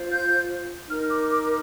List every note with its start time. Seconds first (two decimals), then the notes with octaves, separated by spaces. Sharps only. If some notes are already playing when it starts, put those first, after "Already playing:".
Already playing: F4 C5
0.09 G6
0.88 D#4 F6
0.92 A#4
1.09 D6
1.31 D6